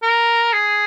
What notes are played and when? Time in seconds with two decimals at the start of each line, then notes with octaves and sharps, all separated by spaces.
0.03 A#4
0.53 G#4